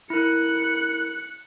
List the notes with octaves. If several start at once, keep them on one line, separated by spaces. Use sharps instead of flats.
E4 A#4 F#6 C#7